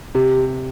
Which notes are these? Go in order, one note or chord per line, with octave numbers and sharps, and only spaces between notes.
C3 G4